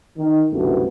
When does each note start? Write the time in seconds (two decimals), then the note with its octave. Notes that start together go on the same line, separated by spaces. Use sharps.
0.18 D#3
0.52 C2 F#2 B2 D3 A3